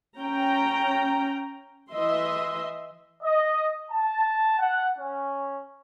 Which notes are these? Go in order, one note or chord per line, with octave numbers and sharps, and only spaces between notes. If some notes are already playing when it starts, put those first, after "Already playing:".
C#4 G5 A#5
E3 D#5 E5 C6
D#5
A5
F#5
C#4